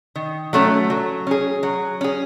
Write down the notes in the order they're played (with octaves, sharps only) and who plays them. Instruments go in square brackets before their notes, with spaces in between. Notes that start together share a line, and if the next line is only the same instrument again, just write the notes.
[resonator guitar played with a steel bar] D#3
F#3 A3 C#4
F#3
C#4 G#4
F#3
C#4 G#4